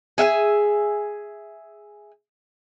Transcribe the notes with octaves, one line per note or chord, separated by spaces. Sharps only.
G#4 E5 F#5 G#5